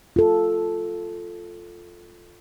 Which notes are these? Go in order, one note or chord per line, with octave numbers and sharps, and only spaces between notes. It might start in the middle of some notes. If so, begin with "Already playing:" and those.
F4 A4